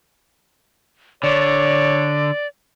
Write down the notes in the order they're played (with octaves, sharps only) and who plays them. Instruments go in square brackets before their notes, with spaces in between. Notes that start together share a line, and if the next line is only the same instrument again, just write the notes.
[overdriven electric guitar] D3 [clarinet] C#5 [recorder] D5